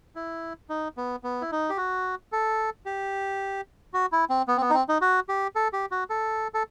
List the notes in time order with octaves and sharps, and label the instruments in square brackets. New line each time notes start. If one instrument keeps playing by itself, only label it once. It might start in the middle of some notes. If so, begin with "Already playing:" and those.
[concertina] E4
D#4
B3
B3
E4
D#4
G4
F#4
A4
G4
F#4
E4
C4
B3
C4
B3
D#4
C4
D#4
F#4
G4
A4
G4
F#4
A4
A4